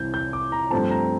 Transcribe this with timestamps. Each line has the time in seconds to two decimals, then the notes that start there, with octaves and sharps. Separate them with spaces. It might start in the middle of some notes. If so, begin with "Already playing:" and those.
Already playing: C2 C3 E3 G6
0.14 G6
0.33 D6
0.52 A#5
0.71 G2 F3 A3 C4 A5
0.91 A#5